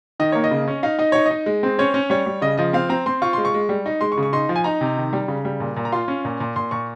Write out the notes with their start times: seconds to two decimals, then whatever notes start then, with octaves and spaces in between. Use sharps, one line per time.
0.20 D#3 D#5
0.32 A#3 C#5
0.44 D#5
0.51 C#3
0.68 C#4
0.83 D#4 F5
0.99 D#4 D#5
1.12 D#4 C#5
1.26 D#4 D#5
1.46 G#3
1.63 C4
1.79 C#4 C#5
1.94 C#4
2.10 G3 C#5
2.26 G3
2.42 C#3 D#5
2.57 F3 D#5
2.73 C4 F5
2.89 C4 A#5
3.06 C4 C6
3.22 F4 C#6
3.33 G#3 C6
3.45 C#6
3.54 G#3
3.69 G3
3.86 D#4
4.01 G#3 C6
4.12 C#6
4.18 C#3
4.23 C#6
4.33 D#4 C6
4.49 F3
4.56 G#5
4.64 D#4 A#5
4.81 C3
4.97 D#3
5.13 G3
5.28 C#3
5.45 G3
5.60 A#2
5.76 A#2
5.85 A#5
5.92 F4 C6
6.08 C#4
6.25 A#2
6.40 A#2
6.56 A#2 C6
6.71 A#2 C#6